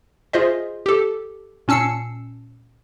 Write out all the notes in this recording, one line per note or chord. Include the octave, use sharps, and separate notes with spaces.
F4 G#4 C5 D#5 E5
G4 A4
A#2 C#4 A5 E6 C7 C#7